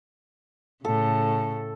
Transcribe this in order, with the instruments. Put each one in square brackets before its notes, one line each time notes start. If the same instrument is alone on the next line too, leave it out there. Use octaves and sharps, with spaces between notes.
[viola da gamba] A2 C#3 [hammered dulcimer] A4